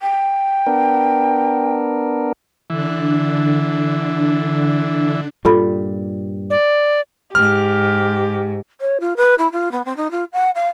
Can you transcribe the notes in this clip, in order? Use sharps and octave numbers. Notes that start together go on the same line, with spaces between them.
G5
B3 D4 A#4
D3 E3 D4
G2 A#2 G3 F4 A4 B5
D5
G#2 G4 F6
C#5
F4
B4
E4
F4
B3
C4
D#4
F4
F#5
F5